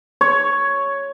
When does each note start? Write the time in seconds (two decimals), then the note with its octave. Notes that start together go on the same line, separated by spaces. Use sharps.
0.21 C#5